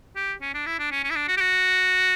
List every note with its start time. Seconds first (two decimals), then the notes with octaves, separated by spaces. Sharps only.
0.16 G4
0.41 C#4
0.54 D4
0.66 E4
0.79 D4
0.91 C#4
1.04 C#4
1.10 E4
1.16 D4
1.28 F#4
1.37 G4
1.41 F#4